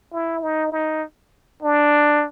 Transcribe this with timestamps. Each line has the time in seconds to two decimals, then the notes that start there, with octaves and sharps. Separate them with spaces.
0.12 E4
0.43 D#4
0.72 D#4
1.62 D4